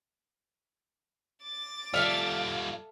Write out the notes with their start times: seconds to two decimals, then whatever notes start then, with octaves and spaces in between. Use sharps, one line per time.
1.43 D6 A6
1.94 G3 F4 A4 D5 E5 F5 F6 F7